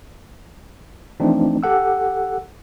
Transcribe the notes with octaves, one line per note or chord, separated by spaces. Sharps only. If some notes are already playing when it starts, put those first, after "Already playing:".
E3 F3 A3 C4 D4 D#4
G4 A4 F#5 E6